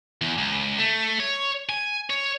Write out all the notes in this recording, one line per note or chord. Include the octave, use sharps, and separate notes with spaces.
E2
C#2
A3
C#5
G#5
C#5